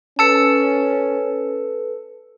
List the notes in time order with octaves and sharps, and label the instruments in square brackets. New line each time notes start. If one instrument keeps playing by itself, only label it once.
[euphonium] C#4 [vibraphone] A4 B4 [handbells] A5 E6 C#7